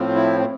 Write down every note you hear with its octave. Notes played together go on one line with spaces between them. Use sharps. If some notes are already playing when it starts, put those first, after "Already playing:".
Already playing: A2 F3 C4
E4